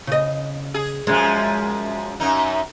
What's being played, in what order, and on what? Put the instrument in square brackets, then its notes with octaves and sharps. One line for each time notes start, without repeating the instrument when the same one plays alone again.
[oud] C#3 D#5
[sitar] G#4
[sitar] F#2 C#3 F3 [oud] G#3
[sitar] F#2 D#4